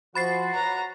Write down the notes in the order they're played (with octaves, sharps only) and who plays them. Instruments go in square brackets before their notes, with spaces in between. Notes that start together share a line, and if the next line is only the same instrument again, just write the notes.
[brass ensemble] F3 [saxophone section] F#4 [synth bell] B5 A6 C7
[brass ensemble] B4 C#5 [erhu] A#5